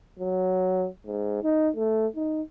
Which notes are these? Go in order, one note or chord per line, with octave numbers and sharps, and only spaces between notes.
F#3
G#2
D#4
A3
D#4